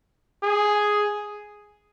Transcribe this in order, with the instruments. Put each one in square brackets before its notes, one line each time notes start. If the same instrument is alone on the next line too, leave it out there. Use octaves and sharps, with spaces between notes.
[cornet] G#4